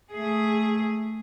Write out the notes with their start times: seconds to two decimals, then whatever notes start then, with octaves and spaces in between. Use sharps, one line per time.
0.12 A3 G#4